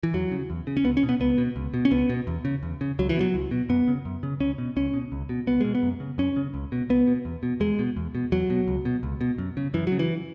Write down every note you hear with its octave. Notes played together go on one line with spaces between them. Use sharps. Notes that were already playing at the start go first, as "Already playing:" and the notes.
E3
E2 F#3
C#3
E2
C#3
C#4
C#2 B3
C#4
B2
B3
C#2 B3
B2
C#2
B2
C#4
C#2 B3
B2
E2
C#3
E2
C#3
C#2 F#3
E3
B2 F#3
C#2
B2
F#2 B3
C#3
F#2
C#3
C#2 C#4
B2
C#2 C#4
B2
C#2
B2
C#2 B3
B2 G#3
B3
F#2
C#3
F#2 C#4
C#3
C#2
B2
C#2 B3
B2
E2
B2
E2 G#3
B2
E2
B2
E2 F#3
B2
C#2
B2
C#2
B2
F#2
C#3
F#2 E3
F#3
C#3
E3